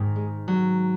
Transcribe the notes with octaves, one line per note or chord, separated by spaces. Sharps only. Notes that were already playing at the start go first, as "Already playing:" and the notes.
Already playing: G#2 D#3
G#3
F#3